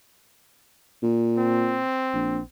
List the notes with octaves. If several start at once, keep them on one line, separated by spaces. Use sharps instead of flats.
A#2
C4
A#1